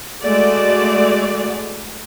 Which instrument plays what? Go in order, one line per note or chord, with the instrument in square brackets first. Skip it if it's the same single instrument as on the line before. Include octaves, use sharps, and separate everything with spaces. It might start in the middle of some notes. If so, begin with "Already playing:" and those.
[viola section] G#3 A3 F#4 D5